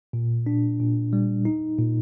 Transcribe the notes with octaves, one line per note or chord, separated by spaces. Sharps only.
A#2
D4
A#2
G3
D#4
A#2